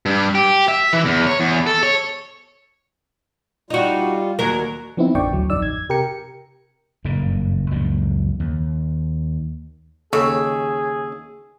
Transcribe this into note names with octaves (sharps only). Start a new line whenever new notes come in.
G2
G4
E5
E3
E2
C#5
E2
A4
C#5
G3 D#4 F4 F#4
D#2 F#3 A#4
F3 B3 C4 D#4 E4
A1 F2 D3 D5 G5 C#6
D2 F#3
A1 F2 D#4 D5 E6
G#6
C3 G4 A#4 G5 A#5 C#7
F#1 G2 A#2 C#3
C#2 F#2 A#2 F3
D#2
D#2 C#3 G#4 A4 C#5